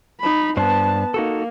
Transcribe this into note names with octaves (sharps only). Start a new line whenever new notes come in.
D#4 B5
G2 B3 D4 C5 A5
A#3 D#4 F#4 A4